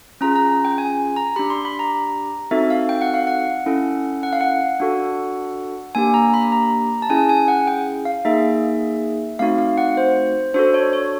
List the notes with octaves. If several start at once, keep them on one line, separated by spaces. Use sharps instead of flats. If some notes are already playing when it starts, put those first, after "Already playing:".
C#4 F4 G#4 A#5
A#5
G5
G#5
A#5
D4 G4 B5
C6
B5
A#5
C4 D#4 F#4 A4 E5
F5
G5
F#5
F5
F#5
C#4 E4 A4
F#5
F5
F#5
D4 F#4 A4
A#3 D4 G4 G#5
A#5
B5
A#5
A5
C#4 E4 G#4 G#5
G#5
F#5
G5
F5
A#3 D#4 G#4 E5
A3 C4 D#4 F#4 F5
F5
F#5
C5
D4 F#4 A4 C5
C#5
C#5